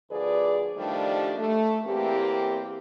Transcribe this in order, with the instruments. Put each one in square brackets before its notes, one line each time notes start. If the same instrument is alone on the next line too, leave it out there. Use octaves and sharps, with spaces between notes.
[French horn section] D2 F3 G#4 B4 D5
D#3 F3 G3 A3 D4 G4
A3
E2 E3 A#3 C4 G4